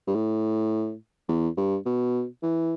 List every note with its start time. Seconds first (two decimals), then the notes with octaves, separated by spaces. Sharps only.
0.07 G2
0.15 A2
1.29 E2
1.57 G2
1.86 B2
2.43 E3